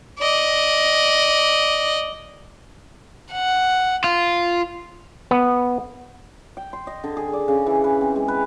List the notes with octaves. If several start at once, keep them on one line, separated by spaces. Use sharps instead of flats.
D5 D#5
F#5
F4
B3
G5
C6
D#5
D3
G#4
D5
C#3
E3
B4
C4
G#3
B4